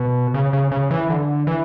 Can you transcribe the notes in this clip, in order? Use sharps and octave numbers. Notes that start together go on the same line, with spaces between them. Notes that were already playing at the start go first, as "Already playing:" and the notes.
Already playing: B2
C#3
C#3
C#3
E3
D3
E3